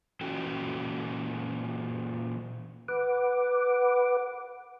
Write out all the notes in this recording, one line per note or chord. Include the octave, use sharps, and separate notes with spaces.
A#2 E3 C#4 F#4 A4 G5
B4 F#5 D6